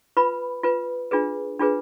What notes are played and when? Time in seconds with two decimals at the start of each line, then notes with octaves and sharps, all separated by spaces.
0.17 F4 B4 B5
0.63 F4 B4
1.11 D4 F4 G#4 B4
1.60 D4 F4 G#4 B4